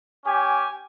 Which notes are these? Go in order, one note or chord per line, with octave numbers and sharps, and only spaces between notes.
C#4 G4 G#5